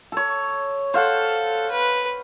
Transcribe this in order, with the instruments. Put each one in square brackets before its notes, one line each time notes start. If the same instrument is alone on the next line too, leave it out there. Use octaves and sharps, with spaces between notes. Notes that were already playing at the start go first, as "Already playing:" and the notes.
[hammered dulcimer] A4 C#5
[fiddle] A4 [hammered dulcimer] C5 F5 F#5
[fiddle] B4